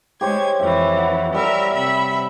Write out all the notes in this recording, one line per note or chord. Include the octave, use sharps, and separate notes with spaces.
G#3 G4 C5 C#5 G#6
F2 E3 E5
F#5
G3 A#4 E5
C3 E5 B5